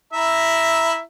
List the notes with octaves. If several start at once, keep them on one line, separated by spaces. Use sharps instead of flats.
E4 E5 A#5